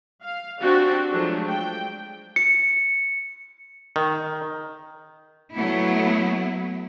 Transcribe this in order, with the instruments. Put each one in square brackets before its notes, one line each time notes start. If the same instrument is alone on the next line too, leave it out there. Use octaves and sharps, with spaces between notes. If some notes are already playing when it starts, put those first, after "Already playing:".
[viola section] F5
C4 D4 F#4 G4
F3 F#3 G#3 A3 D4
G5
[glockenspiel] C#7
[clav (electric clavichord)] D#3
[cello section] F#3 A3 B3 E4